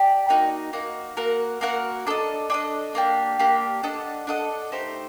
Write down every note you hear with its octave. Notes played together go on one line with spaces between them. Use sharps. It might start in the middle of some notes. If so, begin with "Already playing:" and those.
Already playing: G4 D5 A5
A#3 D#4 F#4
A#3 D#4 F#4
A#3 F#4 A#4 F#5
A#3 F#4 A#4 F#5
D4 A4 D#5
D4 A4 D#5
A#3 D4 G4
A#3 D4 G4
D4 A4 D#5 F#5
D4 A4 D#5 F#5
A3 D#4 G4 C5